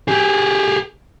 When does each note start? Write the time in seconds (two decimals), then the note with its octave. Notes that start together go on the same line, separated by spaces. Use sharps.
0.08 G4 G#4